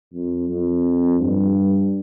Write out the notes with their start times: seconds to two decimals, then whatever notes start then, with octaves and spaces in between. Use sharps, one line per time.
0.13 F2
0.48 F2
1.20 G2